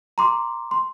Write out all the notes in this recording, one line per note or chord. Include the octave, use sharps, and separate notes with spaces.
A#5 C6 D6
C6